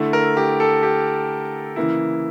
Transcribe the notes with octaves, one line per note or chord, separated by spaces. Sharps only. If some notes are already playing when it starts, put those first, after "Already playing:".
Already playing: D3 A3 E4
A#4
G4
A4
G4
C#3 E3 A#3 E4